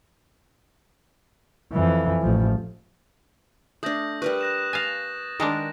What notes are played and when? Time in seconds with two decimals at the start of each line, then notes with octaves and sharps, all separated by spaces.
1.73 F2 E3
2.22 A1 F3
3.83 A3 D4 D#6 G6 A#6
4.22 G3 A#4 B4 C#6 F#6
4.41 F#6 A#6 E7
4.73 F5 G#5 A6 A#6
5.40 D#3 G#3 D4 A#4